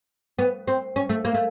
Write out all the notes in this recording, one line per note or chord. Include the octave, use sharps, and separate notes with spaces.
B3
C4
C#4
A3
A#3
A3